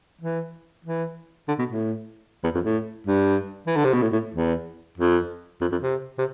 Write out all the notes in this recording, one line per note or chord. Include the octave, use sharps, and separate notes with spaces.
E3
E3
D3
B2
A2
E2
F2
A2
G2
E3
D3
C3
B2
A2
A2
E2
F2
F2
F2
C3
C3